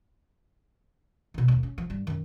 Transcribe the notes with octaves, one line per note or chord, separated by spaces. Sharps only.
B2 D#3
D#2 A#3
C#4
F3
G2 G3
F#2 D#3